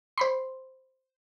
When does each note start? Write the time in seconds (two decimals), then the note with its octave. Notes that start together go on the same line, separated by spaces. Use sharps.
0.18 C5 B5 C6